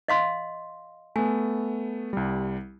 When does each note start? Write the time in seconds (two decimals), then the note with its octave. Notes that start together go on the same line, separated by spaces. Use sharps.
0.08 D#5 F5 C6
1.16 A3 B3 G#5
2.13 C2 G3